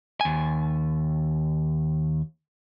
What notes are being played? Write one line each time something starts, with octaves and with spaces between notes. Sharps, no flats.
D#2 G#5